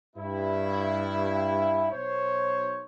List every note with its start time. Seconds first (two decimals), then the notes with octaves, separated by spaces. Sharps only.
0.15 G2 E4
1.91 B1 C5 C#5